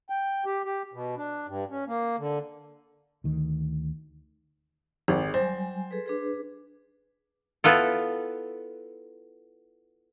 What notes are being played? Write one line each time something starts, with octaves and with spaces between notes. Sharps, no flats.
G5
G4
G4
B2
D4
G2
C#4
A#3
D3
D2 D#3
G#1 G#4
F#3 G3 C5 G#5
G#4 A4 B4
D4 G#4 B4
B3 E4 F4 A4